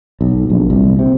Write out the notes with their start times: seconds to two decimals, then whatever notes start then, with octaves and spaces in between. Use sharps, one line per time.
0.21 B1
0.50 A#1
0.70 C2
0.99 C3